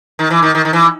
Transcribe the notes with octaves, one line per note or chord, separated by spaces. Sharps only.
D#3
E3
D#3
D#3
D#3
E3